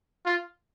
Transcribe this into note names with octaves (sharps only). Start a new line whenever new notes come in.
F4